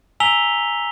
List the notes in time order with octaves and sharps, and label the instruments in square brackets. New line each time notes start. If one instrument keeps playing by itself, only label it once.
[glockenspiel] G#5 A#5 E6 B6 F7 G7